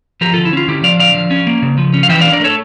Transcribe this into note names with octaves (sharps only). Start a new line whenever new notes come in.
F3 G4 A#4
D3 F4 A4
E4
C#4 F4
D3 E4 G4
F3 D5 F5
D3 D5 F5
F3
C#4
A#3
C#3
F3
C#4
F5
E3 E5 G5
D4 D5 F5
A#4 D5
A3 A4 C#5